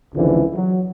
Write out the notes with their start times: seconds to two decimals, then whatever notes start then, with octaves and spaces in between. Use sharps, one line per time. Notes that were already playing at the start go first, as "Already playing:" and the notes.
0.14 G#1 C#2 D3 E3 F3
0.55 F#3